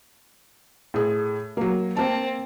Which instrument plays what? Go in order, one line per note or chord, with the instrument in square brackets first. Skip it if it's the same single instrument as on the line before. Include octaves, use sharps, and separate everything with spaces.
[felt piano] A2 G#4
F#3 A#3
[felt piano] A#3 A5 [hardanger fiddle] C4